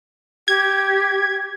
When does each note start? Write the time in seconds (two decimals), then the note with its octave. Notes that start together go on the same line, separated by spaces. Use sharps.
0.48 G4 G#6